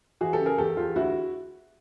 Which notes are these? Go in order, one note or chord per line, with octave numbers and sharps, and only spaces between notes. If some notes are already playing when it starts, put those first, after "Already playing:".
E3 F#4 G#4
G4 A4
C#3
G#4 A#4
E2 G4 A4
E2 F4 G4
D2 E4 F#4